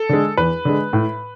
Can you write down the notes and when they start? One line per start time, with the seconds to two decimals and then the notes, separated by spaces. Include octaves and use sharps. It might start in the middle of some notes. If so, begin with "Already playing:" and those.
Already playing: A4
0.09 D3 G#3
0.37 E2 B4
0.65 D3 G#3
0.93 A2